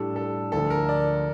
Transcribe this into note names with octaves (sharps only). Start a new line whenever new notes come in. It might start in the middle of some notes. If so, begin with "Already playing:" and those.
Already playing: A2 G3 D4 G4 A4
A4
D2 D3 F3 A4
A#4
D5